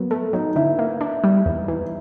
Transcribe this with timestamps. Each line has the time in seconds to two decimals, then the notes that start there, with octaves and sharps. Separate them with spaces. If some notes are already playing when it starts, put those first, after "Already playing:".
Already playing: F#3 A#3 B3
0.11 A3
0.33 F#3 D#4
0.56 D3 E4
0.79 A#3
1.01 D4
1.24 G3
1.46 E2
1.68 E3